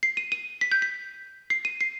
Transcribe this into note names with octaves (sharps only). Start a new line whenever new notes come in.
C7
D#7
D#7
B6
G6
B6
C7
D#7
C7